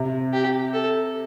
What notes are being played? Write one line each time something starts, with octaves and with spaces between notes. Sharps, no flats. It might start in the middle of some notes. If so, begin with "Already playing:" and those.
Already playing: C3
G4
A4